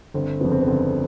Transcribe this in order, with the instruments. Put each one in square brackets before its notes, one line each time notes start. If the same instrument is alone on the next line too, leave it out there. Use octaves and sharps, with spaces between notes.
[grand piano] G1 [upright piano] C4
[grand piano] F2 C#3 [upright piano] B3
[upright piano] C4
B3
[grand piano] G1